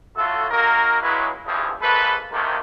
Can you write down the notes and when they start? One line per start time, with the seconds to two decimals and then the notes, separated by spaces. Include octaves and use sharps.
0.16 A2 A3 F4 F#4 A4
0.51 A#3 D#4 F#4 A#4
1.02 C#2 F#3 G#3 E4 B4
1.45 G#1 E2 G2 F3 E4 G#4
1.82 A#1 G#3 A#3 A4 B4
2.32 D2 C3 D#3 A3 A#3